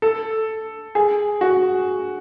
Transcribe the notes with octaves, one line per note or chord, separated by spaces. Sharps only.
A4
G#4
F#4